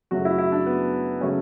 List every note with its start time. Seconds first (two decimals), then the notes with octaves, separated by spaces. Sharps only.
0.11 F#2 C#3 F#3 A3 F#4
0.25 E4
0.38 E4
0.52 D4
0.66 B3
1.21 C#3 F#3 A3 C#4